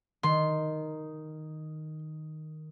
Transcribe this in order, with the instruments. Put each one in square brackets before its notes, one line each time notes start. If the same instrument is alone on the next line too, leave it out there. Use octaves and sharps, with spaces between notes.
[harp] D#3 [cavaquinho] C6